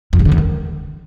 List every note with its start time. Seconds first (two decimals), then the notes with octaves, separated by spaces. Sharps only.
0.13 F2
0.19 C3
0.25 D3
0.32 E2
0.38 D#3